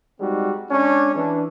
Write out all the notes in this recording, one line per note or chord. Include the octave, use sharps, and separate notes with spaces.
G3 G#3 C4 D#4 F#4
G#3 C#4 D4
E3 D4